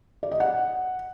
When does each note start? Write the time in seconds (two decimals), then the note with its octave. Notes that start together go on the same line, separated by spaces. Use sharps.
0.23 D5
0.32 D#5
0.40 F#5